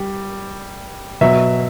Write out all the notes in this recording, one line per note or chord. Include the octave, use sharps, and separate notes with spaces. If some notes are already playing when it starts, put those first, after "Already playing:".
Already playing: G3
B2 F#3 E5